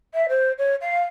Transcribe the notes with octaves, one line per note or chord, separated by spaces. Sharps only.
E5
C5
C#5
F5